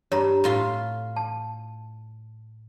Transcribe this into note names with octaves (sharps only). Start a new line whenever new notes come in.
G2 C#5 A#5
A2 F4 C6
A5